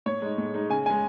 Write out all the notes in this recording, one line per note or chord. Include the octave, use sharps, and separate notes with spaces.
A2 C#5
G#3 D#4
A2
G#3 D#4
C#3 G#5
G#3 C#4 G#5